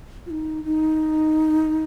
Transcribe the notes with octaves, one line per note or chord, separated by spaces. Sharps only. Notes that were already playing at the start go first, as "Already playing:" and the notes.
F4
D#4
D#4